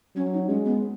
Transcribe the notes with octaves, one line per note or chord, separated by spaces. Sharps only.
F#3 C#4
D#4
G#3 C#4
B3